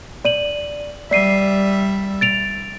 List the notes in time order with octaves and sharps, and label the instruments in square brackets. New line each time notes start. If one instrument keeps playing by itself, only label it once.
[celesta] D5 D#7 F#7
[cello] G3 E5 [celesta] D5 C7 D#7
[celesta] A6 D7 F7